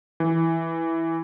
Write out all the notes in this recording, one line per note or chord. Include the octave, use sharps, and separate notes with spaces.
E3